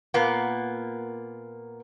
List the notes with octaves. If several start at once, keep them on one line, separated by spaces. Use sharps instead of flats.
A#2 A#3 B3